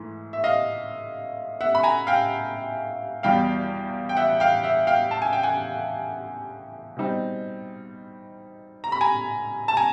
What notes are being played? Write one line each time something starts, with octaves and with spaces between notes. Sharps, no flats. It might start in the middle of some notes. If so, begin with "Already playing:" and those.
Already playing: G#2 E3 A3
E5
D#5 F5
E5 F#5
B5
G#5 A#5
F5 G5
E2 B2 G3 F5 G5
G5
E5 F#5
F5 G5
E5 F#5
F5 G5
A5
G#5
G5
F#5 G#5
B2 G3 C4 D#4
A#5
B5
G#5 A#5
A5
G#5 A#5